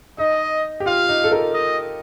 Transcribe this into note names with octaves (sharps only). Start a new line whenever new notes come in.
D#4 D#5
G4
F4 F5
D#4
A4
A#4
D#5